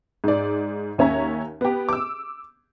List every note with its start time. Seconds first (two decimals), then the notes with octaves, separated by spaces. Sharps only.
0.24 G#2 D5
0.98 D#2 C#4 C#5 E5 A#5
1.61 B3 G4
1.89 D6 E6